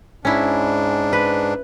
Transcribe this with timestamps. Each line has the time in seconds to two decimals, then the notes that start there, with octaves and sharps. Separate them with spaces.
0.25 G#2 C#4 D4 E4
1.13 B4